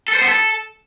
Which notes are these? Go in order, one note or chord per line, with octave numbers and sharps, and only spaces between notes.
A4
C5
B3
A4